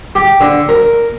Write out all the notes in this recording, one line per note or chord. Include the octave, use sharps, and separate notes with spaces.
G4
D3
A#4